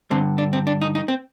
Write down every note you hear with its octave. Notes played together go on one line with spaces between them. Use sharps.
G2 D3 C4
D4
C4
D4
D#4
D#4
C4